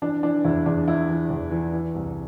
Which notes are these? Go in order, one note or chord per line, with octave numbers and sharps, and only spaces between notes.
E3 D4
E3 D4
E2 E4
E2 D4
E3 E4
E3
E2
E3
E3
C2